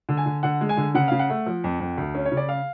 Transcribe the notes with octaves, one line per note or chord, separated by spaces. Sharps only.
D3
G#5
D3
D3 F#5
G#3
G#5
D3
C#3 F#5
C#3 F5
F#5
A3
F3
F2
F2
D2
C#4
C#5
C#3
D5
F5